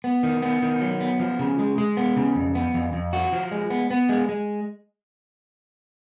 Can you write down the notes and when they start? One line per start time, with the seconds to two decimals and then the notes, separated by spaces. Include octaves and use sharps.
0.04 B3
0.23 D#3
0.42 B3
0.62 D#3
0.81 F#3
1.00 B3
1.20 F3
1.39 C#3
1.59 G#3
1.78 G#3
1.97 B3
2.16 C#3
2.35 F2
2.55 B3
2.74 F2
2.93 F2
3.13 F#4
3.33 F3
3.51 G#3
3.70 B3
3.91 B3
4.09 G#3
4.29 G#3